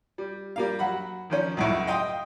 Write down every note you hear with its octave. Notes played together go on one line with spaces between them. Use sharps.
G3
G3 A#3 F5
F#3 F#5 B5
D#3 F3 C#4
C#2 F#2 A2
D#5 F5 G5 C6 D#6